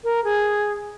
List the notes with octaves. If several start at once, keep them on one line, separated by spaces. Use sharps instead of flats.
A#4
G#4